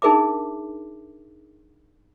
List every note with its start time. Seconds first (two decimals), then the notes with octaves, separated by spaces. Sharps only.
0.02 D4 D#4 G#4 A#4 E5 D6